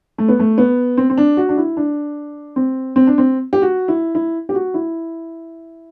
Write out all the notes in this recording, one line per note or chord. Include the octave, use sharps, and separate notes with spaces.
A3
B3
A3
B3
C4
C4
D4
F#4
D4
E4
D4
C4
C4
D4
C4
G4
F#4
E4
E4
G4
F#4
E4